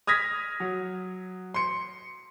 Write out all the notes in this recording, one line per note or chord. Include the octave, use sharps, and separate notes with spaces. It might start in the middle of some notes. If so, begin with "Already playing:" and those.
D#6 F6 G#6 A#6 B6
F#3
C6 C#7